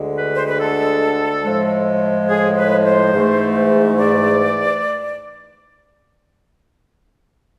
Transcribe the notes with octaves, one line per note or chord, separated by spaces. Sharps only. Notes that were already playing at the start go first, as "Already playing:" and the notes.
Already playing: D2 D3 G#3
B4
C5
B4
A4
A2 F3 G#3
G#4
B4
C5
G#2 E3 A3
D5